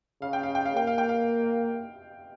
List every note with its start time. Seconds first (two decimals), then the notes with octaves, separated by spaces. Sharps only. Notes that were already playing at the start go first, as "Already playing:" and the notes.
0.22 C#3 F5
0.33 G5
0.43 F5
0.55 G5
0.65 F5
0.76 A#3 G5
0.87 F5
0.98 G5
1.09 F5